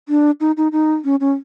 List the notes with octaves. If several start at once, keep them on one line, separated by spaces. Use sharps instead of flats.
D4
D#4
D#4
D#4
C#4
C#4